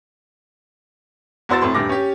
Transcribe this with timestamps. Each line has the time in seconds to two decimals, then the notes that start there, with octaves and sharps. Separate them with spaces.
1.49 E2 F#4 C5 E6 A6
1.62 F2 A2 C6
1.74 D#1 G2 G4 D6 A#6
1.89 C#4 G4